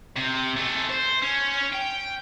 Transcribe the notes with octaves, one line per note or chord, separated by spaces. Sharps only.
C3
A3 G#4
C5
C#4
G5